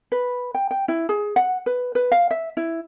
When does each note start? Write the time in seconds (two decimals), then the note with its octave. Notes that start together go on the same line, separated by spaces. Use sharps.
0.12 B4
0.55 G5
0.71 G5
0.88 E4
1.09 G#4
1.36 F#5
1.66 B4
1.95 B4
2.12 F5
2.31 E5
2.57 E4